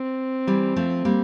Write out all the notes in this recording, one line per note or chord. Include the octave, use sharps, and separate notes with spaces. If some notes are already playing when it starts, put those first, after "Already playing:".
Already playing: C4
E3 G3
F3 A3
G3 A#3